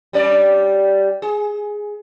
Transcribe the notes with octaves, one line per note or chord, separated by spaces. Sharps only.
G3 C#4 D5
G#4